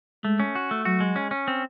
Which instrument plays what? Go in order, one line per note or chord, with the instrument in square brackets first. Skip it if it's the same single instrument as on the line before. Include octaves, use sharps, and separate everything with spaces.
[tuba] G#3 [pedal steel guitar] A3
[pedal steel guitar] C#4
F#4
A3
[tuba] F#3 [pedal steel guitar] F#4
[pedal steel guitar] G#3
C#4
C#4
C4